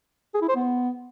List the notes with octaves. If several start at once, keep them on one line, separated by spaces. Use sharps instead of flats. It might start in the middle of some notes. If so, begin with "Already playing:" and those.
G#4
E4
C5
B3